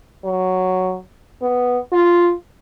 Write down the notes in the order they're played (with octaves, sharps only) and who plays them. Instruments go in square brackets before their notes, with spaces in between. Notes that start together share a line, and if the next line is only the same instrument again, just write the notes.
[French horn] F#3
B3
F4